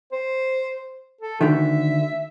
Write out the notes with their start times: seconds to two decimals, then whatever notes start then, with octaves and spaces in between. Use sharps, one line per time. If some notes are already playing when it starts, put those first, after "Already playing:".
0.12 C5
1.21 A4
1.41 D2 D3 D#3 E5